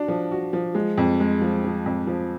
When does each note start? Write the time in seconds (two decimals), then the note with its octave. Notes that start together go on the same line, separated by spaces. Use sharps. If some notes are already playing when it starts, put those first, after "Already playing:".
Already playing: D4 F#4
0.08 F3
0.32 F#4
0.53 F3
0.75 G#3
0.98 F2
1.20 G#3
1.41 F3
1.64 F3
1.86 F2
2.07 F3